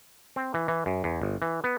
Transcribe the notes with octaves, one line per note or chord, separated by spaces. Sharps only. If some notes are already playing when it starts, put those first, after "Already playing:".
C4
E3
E3
F#2
E2
G1
E3
B3